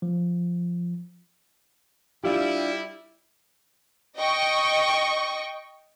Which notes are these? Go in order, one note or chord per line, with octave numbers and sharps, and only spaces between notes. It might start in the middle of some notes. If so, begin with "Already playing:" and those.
F3
G3 D4 E4 F4 G4
D#5 G5 C#6